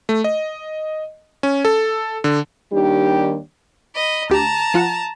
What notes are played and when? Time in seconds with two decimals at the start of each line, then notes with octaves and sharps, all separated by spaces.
0.09 A3
0.24 D#5
1.43 C#4
1.65 A4
2.24 D3
2.72 D#2 D#3 G3 D4 G4
3.95 D#5 B5
4.30 D2 G4 A5 A#5
4.74 F3 F4 F#5